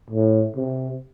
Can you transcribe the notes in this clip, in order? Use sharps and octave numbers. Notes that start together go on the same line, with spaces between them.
A2
C3